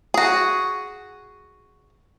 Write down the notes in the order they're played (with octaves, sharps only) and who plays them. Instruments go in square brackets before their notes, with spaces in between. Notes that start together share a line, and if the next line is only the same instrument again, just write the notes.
[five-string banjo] F#4 G#4